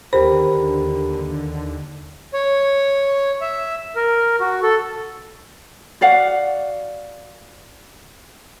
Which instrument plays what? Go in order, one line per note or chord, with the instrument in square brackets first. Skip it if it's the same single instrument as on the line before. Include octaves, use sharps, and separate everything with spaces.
[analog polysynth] D#2 D3 [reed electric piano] G4 A#4 B5 [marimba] C5
[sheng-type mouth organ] C#5
E5
A#4
F#4
A4
[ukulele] F#4 D5 F5 F#5